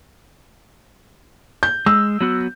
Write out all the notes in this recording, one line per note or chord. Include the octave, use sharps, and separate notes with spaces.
G6
G#3 E6
F#3 B3 F#4